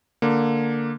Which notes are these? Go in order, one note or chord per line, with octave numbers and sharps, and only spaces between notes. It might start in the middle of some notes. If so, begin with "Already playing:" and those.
D3 A#3